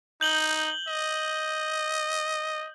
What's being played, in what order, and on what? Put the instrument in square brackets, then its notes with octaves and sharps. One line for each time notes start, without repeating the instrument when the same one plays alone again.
[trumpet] D#4 [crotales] G6 F#7 G7
[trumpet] D#5